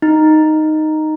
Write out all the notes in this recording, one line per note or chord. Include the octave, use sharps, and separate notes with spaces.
D#4